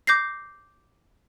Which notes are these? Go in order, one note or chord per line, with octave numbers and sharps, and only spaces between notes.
D6 G6 A#6 C7